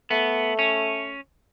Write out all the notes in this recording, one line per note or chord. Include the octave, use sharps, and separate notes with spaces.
A3 B3
C#4